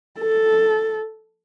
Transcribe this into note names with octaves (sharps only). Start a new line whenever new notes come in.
A4